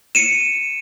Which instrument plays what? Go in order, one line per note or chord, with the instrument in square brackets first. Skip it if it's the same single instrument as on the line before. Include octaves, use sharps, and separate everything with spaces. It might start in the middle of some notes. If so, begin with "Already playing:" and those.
[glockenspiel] C#7 D#7 E7